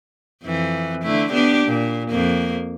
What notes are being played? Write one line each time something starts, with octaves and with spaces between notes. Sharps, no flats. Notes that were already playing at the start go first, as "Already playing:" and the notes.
F2 E3
D3 A3 E4
B3 D4 G4
A#2
F2 A#3